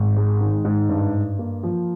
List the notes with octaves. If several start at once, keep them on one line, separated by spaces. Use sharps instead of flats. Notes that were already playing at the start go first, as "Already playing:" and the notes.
Already playing: G#1
G#3
D#3
G#2
G2
G2
A#3
F3